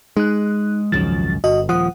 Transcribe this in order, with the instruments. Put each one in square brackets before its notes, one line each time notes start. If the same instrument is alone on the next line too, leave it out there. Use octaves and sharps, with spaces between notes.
[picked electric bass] G#3 [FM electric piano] D#4 F#6
[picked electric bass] G#1 C#2 F#2 [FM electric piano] D#3 F3 A6
[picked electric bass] G1 [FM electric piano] F#4 D#5
[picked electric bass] D#1 F3 [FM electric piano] F#5 D#6